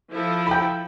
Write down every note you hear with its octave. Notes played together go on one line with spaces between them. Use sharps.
F3 E4 A4
G5 B5